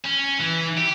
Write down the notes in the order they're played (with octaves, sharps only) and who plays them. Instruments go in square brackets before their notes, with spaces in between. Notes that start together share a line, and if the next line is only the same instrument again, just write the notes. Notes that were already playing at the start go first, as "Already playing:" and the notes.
[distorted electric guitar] C#4
E3
G4